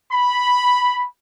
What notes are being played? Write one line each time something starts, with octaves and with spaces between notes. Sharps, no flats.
B5